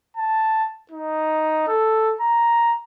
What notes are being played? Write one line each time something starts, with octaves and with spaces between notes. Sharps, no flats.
A5
D#4
A4
A#5